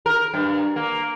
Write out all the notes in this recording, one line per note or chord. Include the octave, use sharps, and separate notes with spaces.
A#4
G2
A#3